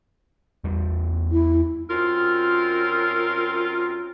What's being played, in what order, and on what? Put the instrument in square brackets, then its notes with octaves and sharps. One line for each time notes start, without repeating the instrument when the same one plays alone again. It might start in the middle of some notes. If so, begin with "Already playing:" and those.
[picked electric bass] E2 G3
[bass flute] E4
[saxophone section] F#2 C4 A#4 [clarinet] F4